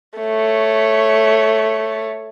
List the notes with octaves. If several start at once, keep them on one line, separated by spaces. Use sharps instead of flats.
A3 C#5